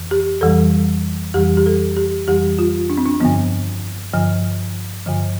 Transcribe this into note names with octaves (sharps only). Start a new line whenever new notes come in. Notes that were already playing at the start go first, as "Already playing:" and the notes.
Already playing: F2 E3
G4
F2 E3 G3 A4
F2 E3 G3 G4
G4
A4
G4
F2 E3 G3 G4
F4
D4
C4
D4
G2 D3 F3 B3
G2 D3 F3
G2 D3 F3